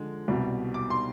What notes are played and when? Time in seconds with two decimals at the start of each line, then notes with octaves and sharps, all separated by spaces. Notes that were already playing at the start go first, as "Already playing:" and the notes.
Already playing: D3 F3 G#3
0.28 C2 B2 G3
0.74 D6
0.90 C6